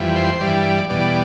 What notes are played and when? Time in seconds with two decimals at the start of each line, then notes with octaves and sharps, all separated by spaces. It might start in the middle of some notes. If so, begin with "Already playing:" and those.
Already playing: F2 E3 G3
0.16 C5
0.41 G2 E3 G3 D5
0.89 E2 B2 G3 D5